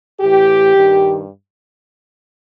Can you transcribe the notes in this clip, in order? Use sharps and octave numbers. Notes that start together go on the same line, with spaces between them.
A2 E3 G4
G2 D#3